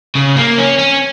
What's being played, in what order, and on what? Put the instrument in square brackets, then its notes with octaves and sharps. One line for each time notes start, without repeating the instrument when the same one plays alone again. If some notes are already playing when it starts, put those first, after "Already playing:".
[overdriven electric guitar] C#3
A#3
C#4
C#4